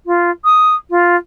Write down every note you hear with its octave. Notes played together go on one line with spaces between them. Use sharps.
F4
D#6
F4